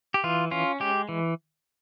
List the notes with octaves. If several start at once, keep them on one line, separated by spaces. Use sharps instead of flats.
G4
E3 F4
C#4 F4
G#3 G4
E3